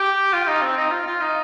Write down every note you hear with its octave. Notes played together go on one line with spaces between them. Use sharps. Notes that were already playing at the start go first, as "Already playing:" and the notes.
Already playing: G4
F4
D#4
C4
D#4
F4
F4
D#4